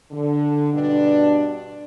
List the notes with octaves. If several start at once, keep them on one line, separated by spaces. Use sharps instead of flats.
D3
G2 B2 D4